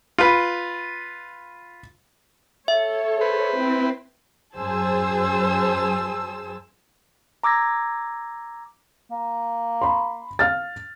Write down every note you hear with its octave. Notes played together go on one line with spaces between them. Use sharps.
F4 B4
A4 C#5 E5
B4 C5
C4 E4
F#2 F#3 G#4 C5 A5 E6
A#5 D6 E6 G#6 A#6
A#3
B5 C6
F5 F6 A6